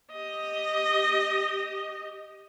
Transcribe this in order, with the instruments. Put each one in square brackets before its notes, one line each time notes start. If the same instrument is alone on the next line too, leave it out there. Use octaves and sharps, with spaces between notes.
[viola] G4 D#5